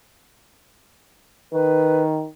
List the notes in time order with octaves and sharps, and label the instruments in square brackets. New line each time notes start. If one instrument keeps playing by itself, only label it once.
[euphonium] D#3 [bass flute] B4